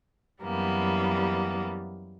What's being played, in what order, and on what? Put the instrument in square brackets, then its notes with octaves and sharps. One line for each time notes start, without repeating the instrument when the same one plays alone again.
[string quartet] F#2 E3 G3 A#3 B3